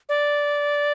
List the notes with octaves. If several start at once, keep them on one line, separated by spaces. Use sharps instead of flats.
D5